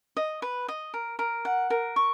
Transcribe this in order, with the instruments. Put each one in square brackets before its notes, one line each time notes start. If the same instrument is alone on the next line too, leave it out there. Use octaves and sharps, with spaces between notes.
[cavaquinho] D#5
B4
D#5
A#4
A#4
F#5
A#4
C#6